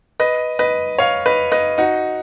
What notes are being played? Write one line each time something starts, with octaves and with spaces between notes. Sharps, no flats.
B4 D#5
B4 D#5
C#5 F5
B4 D#5
B4 D#5
D#4 F#4